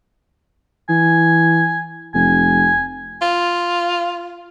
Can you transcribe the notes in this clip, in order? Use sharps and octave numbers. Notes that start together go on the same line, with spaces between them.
E3 G#5
F1 G#5
F4